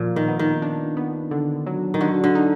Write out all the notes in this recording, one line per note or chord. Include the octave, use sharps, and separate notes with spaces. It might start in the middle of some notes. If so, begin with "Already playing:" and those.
Already playing: A#2 F3 A#4
D#3
B3
D#3
D4
B3
D3
F#3
D#3
D3 F#4
D3
D#4